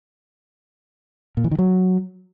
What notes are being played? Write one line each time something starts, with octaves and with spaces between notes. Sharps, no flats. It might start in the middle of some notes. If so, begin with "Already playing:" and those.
A#2
E3
D#3
F#3